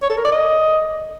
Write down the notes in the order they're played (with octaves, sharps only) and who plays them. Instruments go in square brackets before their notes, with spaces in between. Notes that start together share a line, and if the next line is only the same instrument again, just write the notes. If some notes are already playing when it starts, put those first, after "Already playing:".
[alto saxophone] C#5
A4
A#4
D5
D#5